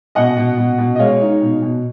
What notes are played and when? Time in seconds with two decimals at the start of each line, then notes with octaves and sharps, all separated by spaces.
0.15 B2 D#5 F#5
0.37 B2
0.58 B2
0.78 B2
0.95 D#5
0.99 G#3 C#5 F5
1.21 D#4
1.41 B2
1.62 B2